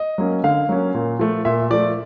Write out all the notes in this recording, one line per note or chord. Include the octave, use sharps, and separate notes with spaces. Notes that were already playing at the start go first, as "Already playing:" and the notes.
Already playing: D#5
F#3 A#3 C#4
D3 F5
F#3 A#3 C#4
A#2
F3 A3
A#2 E5
F3 A3 D5